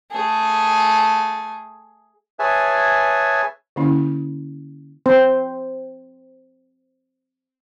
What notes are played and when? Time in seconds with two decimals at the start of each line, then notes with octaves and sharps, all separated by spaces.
0.11 A3 G#4
2.39 G#4 B4 C#5 E5 G#5 A5
3.76 D3 A#3 C#4 E4
5.06 C4 C5